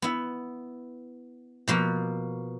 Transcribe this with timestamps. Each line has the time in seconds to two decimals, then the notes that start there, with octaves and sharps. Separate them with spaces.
0.02 B3 E4
1.68 B2 F3 A#3